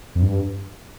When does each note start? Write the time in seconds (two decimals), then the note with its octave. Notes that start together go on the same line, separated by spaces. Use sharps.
0.15 F2
0.22 G2